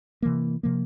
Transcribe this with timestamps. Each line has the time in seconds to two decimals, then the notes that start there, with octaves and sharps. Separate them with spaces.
0.22 C3 E3 A#3
0.63 C3 F3 A#3